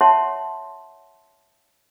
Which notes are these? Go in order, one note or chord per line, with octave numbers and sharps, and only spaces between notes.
C#5 E5 F#5 A5 C6 C#6